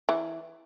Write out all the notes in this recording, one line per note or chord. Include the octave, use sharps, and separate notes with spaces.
E3